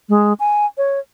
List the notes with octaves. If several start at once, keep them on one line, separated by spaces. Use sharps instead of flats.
G#3
G#5
C#5